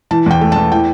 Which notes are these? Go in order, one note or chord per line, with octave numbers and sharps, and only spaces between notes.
E3 A5
E2 G5
A3
A5
E2
E3 G5